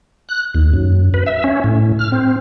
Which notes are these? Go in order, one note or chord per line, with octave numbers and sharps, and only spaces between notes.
F#6
D#2
F#2
B4
E5
C#4
A2
F6
C4